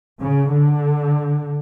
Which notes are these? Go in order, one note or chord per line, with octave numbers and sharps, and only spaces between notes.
C#3
D3